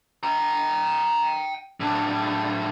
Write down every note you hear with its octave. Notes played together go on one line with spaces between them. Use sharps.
G5 A#5
A2 D4